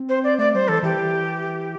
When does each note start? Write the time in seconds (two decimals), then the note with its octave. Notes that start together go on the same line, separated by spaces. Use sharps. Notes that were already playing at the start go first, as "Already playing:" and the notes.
Already playing: C4
0.09 C5
0.24 D5
0.39 A3 D5
0.54 G3 C5
0.68 E3 A4
0.83 E3 G4